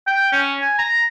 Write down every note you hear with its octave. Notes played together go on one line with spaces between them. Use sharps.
G5
C#4
G#5
A#5